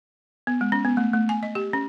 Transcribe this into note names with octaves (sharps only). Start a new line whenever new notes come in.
B3
G#3
C#4
B3
A3
A3
G#5
D#5
G4
C#4